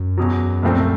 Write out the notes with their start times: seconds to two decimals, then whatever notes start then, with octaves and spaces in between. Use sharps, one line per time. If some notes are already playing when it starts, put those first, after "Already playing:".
Already playing: F#2
0.18 E2 B2 F#3
0.63 C2 A#2 F3 A3 C4